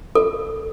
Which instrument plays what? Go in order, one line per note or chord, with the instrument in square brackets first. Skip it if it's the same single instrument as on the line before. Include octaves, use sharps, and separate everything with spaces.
[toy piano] A4